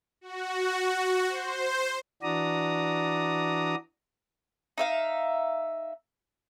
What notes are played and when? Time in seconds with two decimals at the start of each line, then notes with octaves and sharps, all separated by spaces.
0.21 F#4
1.28 C5
2.23 E3 D4 F#4 D5 A#5 D#6
4.78 D#4 E5 F5